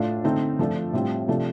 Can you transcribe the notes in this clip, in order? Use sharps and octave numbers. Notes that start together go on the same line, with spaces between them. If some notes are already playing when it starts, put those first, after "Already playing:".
Already playing: A2 A3 D4 F4
D3 A3 C4 D#4
F3 A3 D4 F4
A2 G3 C4 F4
C3 F3 A3 D4